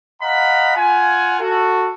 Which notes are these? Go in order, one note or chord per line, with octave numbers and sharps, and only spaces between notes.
D#5 F5 F#5 A#5 B5
F4 F#5 G#5
F#4 A4